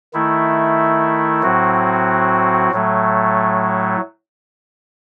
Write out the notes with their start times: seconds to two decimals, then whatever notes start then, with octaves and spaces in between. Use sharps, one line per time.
0.14 D#3 A3 E4
1.42 A2 F#3 C4 F#4
2.72 A2 F#3 A3